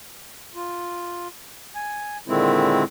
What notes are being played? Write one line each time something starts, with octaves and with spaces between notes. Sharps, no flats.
F4
G#5
A#2 D3 D#3 G#3 C4 E4